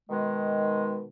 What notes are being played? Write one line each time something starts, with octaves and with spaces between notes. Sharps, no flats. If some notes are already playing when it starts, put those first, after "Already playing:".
B2 D#3 G#3